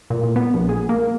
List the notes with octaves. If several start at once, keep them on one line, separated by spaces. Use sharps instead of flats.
A#2
A#2
B3
A#1
G#4
A#3